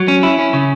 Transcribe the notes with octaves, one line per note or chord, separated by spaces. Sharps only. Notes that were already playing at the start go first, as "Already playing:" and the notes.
Already playing: F#3
C#4
E4
C#4
C#3